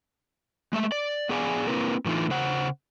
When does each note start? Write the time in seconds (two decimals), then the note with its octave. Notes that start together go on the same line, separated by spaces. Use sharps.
0.73 G#3 A3 E5
0.92 D5
1.29 B3 G#4 D5 F5 G#5
1.67 A#3 C4 E4 A#4 B4
2.05 A2 E3 A3 D#4 F4
2.30 C#3 C5 F#5